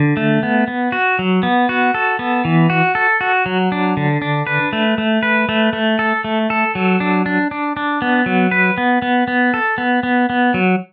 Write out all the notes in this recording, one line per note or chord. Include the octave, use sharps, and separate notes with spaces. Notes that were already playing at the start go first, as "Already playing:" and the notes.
Already playing: D3
A3
B3
B3
F#4
F#3
B3
F#4
A4
B3
E3
F#4
A4
F#4
F#3
D4
D3
D4
B4
A3
A3
B4
A3
A3
A4
A3
A4
F#3
D4
D4
D4
D4
B3
F#3
B4
B3
B3
B3
A4
B3
B3
B3
F#3